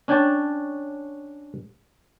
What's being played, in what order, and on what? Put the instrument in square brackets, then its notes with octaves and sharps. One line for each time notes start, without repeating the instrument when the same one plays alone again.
[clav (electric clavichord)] C#4 D4 C#5 G5 A5